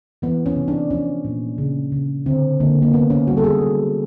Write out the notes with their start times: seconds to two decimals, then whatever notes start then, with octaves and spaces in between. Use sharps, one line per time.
0.22 E3 B3
0.46 C#4
0.56 C3
0.68 D4
0.90 F3 C#4
1.25 A#2
1.58 C#3
1.92 C#3
2.26 D3 C4
2.60 D3 A#3
2.82 A#3
2.93 C3 B3
3.10 C#4
3.28 G3 F#4
3.37 A4
3.44 G#4
3.61 F#3